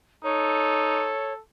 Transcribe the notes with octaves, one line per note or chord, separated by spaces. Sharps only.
D#4 A4 C#5